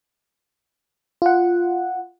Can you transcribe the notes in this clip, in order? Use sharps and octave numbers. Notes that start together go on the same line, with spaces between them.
F4 F#5